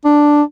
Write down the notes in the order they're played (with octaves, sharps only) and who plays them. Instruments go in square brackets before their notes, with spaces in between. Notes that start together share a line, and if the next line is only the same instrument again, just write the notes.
[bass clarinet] D4